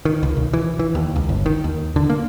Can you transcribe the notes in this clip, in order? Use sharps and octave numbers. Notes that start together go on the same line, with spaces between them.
D#3
C#2
B1
E3
E3
D#2
C#2
G1
D#3
D#2
D3
A#3